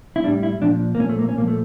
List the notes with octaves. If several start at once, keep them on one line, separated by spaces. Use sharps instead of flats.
E4
A2 G3 D4
E4
A#2 F3 D4
A#3
A#2 F3 C#4
A3
A#3
C#4
A#2 F3 A#3
A3